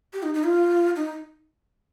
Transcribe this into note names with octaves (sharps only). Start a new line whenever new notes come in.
G4
D#4
D#4
F4
D#4